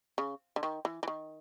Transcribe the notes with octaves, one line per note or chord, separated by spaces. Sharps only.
C#3
D3
D#3
E3
E3
D#3